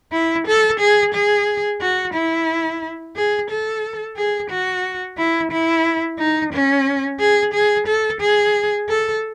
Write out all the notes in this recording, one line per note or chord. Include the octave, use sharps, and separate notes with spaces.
E4
A4
G#4
G#4
F#4
E4
G#4
A4
G#4
F#4
E4
E4
D#4
C#4
G#4
G#4
A4
G#4
A4